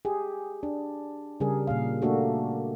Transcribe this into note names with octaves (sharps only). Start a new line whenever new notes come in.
G4 G#4
D4
C#3 G3 G#4 A#4
A#2 A#3 F5
A3 A#3 D4 F#4 A4